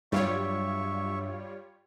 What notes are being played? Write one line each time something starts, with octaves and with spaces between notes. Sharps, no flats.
G2 F#3 G3 F4 C#5 E5 C#6